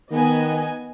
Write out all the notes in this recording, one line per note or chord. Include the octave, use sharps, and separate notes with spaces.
D#3 B3 D#5 G#5